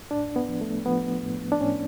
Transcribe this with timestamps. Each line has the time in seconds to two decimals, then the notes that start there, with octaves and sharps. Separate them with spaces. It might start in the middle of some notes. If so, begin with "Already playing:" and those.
0.11 A2 D4
0.36 B3
0.48 F3
0.61 A3
0.86 F3 B3
1.23 A2
1.52 D4
1.61 A2 C#4